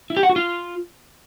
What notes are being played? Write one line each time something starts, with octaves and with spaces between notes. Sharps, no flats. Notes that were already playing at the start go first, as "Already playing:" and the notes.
E4
G4
F#5
F#4
F4